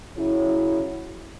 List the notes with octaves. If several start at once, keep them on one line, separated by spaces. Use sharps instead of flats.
C#3 F#3 C#4 E4